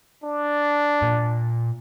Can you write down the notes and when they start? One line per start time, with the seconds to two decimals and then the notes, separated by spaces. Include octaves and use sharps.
0.24 D4
1.02 A#2